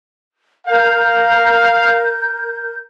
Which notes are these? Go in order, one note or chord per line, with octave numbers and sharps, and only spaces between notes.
A#4 F5 G6